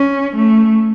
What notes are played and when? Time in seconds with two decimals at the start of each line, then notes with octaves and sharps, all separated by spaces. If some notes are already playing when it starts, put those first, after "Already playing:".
Already playing: C#4
0.36 A3